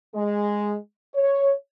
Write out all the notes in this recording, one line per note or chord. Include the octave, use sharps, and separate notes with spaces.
G#3
C#5